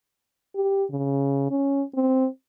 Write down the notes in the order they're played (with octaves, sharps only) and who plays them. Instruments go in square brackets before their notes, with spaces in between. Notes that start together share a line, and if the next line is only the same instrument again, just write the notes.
[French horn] G4
C#3
C#4
C4